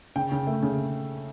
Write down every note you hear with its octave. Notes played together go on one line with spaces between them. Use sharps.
C#3 G5
C#3
A3
C#3